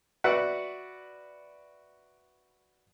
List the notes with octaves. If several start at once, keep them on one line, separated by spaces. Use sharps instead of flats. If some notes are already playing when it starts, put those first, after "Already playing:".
F#4 B4 D5 E5 F#5